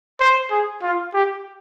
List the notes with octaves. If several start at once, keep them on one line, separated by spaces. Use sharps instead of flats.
C5
G#4
F4
G4